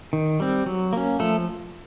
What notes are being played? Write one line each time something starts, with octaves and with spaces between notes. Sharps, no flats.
D#3
G3 C4
F#3
A#3 C#4
F3 A3 A4